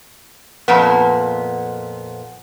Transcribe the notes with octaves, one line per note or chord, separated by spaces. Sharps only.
F2 A#2 B3